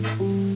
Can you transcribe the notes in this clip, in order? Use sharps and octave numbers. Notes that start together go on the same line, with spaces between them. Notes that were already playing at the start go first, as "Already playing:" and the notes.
Already playing: A2
G3